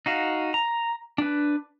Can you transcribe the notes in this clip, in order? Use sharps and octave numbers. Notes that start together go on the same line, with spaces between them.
D#4 F#4 F5
A#5
D4 B4